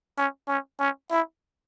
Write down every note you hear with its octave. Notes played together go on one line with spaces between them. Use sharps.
C#4
C#4
C#4
E4